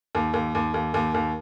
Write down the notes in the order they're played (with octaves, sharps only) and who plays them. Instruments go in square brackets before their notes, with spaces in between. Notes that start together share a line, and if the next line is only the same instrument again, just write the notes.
[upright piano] D#2
D#2
D#2
D#2
D#2
D#2